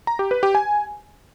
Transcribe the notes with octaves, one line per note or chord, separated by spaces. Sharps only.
A#5
G4
B4
G4
G#5